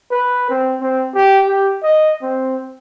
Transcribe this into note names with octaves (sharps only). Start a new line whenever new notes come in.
B4
C4
C4
G4
G4
D#5
C4